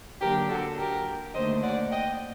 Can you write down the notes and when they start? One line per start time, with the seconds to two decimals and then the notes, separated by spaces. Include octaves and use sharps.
0.21 D3 F#3 A#3 D4 G4 A#4
0.49 F#4 A4
0.78 G4 A#4
1.34 D#2 D3 A3 C5 D#5
1.63 D5 F#5
1.91 D#5 G5